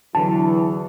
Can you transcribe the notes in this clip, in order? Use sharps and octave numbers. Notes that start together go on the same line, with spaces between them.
E2 D3 E3 F#3 A5